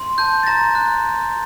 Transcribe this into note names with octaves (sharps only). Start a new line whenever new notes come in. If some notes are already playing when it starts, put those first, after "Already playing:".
Already playing: C6
A5 G6
A6
A#5 A#6
F#6